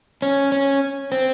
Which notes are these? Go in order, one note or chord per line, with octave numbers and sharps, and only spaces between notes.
C#4
C#4
C4